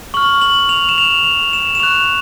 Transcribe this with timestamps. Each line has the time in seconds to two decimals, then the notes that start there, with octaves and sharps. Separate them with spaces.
0.14 C#6 F6 F#7
0.41 F#7
0.69 F7
0.89 E7
0.98 F7
1.24 F7
1.53 E7
1.75 E7
1.80 C#6 F#6 F7